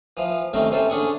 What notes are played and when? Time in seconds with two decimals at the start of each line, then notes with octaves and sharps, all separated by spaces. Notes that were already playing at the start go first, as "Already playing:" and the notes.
0.17 E3 F3
0.53 C3 D#3 A3 C4 C#4
0.71 C3 E3 C#4 A4 C5
0.90 D3 C#4 D4 G#4 C#6